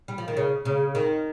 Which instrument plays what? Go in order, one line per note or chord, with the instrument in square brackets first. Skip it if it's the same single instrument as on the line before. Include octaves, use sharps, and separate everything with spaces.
[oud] G3
F3
D#3
C#3
C#3
D#3